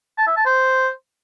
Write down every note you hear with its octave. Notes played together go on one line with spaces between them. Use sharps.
A5
E5
A5
C5